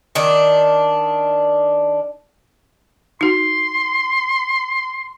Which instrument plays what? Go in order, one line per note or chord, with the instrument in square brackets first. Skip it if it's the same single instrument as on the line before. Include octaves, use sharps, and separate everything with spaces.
[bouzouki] D#3 D4
[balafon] D#4 F#4 [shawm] C6